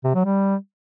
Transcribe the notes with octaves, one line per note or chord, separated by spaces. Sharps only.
C3
F#3
G3